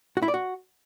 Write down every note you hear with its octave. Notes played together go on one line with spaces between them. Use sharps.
F#4
E4
D5
F#4